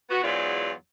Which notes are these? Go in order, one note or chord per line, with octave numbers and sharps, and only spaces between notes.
B3 F#4
E2 G#2 F#3 F4 D5